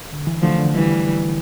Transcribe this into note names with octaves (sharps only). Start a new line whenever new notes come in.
D3
E3
D3 F3 A3
D3
E3 G3